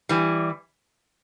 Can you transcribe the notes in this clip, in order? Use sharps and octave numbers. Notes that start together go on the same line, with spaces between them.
E3 G3